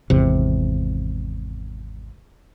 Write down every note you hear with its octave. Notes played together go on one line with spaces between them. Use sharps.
G#1 E2 C3